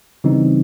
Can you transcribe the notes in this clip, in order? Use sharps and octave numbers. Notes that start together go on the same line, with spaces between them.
C#3 E3 G3 C4 D#4